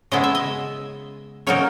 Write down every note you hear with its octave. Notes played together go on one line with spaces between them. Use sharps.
C#3 G#3 B3 E4 D#5
E5
D#5
C#3 F#3 A#3 D#4 C#5